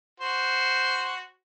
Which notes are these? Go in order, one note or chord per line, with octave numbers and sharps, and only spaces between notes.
F#4 C5